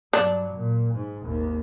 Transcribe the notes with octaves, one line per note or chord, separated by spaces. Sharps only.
G2 F#3 D4
A#2
G#2
G#1 D#2